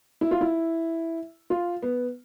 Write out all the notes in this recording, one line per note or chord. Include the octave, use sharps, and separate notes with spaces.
E4
F4
E4
F4
B3